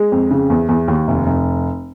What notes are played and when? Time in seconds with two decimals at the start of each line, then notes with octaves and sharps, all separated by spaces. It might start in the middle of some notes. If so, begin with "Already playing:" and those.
Already playing: G#3
0.12 F2
0.31 C#3
0.50 E2
0.69 E2
0.88 D#2
1.08 F1
1.26 F1